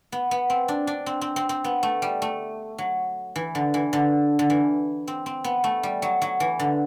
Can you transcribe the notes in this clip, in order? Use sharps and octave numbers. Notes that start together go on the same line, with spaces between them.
B3
B3
C4
D4
D4
C4
C4
C4
C4
B3
A3
G3
A3
F#3
E3
D3
E3
D3
D3
E3
C4
C4
B3
A3
G3
F#3
F#3
E3
D3